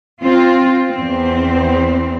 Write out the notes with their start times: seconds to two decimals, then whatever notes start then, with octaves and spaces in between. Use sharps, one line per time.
0.22 C4 F4
0.90 E2 C4